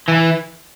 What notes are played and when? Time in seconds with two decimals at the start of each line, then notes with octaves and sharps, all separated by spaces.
0.08 E3